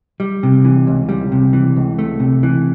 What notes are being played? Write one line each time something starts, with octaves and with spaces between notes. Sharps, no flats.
G3
C3
E3
C#2
G3
C3
E3
C#2
A3
C3
E3